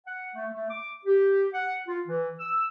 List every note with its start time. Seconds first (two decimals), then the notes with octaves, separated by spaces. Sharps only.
0.06 F#5
0.34 A3
0.54 A3
0.69 D6
1.05 G4
1.53 F#5
1.87 F4
2.07 E3
2.39 E6